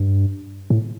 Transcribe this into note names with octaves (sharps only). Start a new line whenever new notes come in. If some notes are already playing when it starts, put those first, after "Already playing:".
Already playing: G2
A2